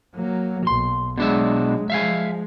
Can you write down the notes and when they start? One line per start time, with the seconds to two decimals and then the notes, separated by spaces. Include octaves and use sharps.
0.16 F#3 A#3
0.67 B1 C6
1.18 B2 F#3 G#3 D4 E5
1.90 F3 G#3 E5 F5 G#5